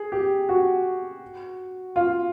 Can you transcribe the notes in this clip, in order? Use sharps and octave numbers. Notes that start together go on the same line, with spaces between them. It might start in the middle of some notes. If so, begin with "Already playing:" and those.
Already playing: G#4
G4
F#4
F4